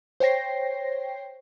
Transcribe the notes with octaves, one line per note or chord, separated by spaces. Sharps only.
C5 C#5 G5 A#6 C7